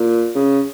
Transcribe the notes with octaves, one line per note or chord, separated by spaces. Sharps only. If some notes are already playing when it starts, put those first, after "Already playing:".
Already playing: A#2
C#3